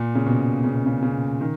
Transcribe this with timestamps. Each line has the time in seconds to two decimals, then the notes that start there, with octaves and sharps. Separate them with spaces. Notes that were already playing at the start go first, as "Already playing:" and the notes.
Already playing: A#2
0.15 C#3
0.27 B2
0.64 C#3
0.75 B2
0.86 C#3
1.03 C#3
1.41 D#3